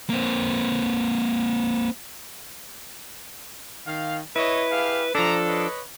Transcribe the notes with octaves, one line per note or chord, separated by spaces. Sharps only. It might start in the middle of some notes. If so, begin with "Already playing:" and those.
A#3 C4
D#3 F5
E4 B4 C#5 D#5
G4 G#4 F5
F3 D4 A4 A#5
B4 C#5 D#5